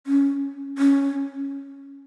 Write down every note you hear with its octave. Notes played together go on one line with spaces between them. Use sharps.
C#4
C#4